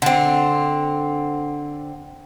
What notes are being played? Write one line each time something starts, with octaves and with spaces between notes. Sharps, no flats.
D3 C4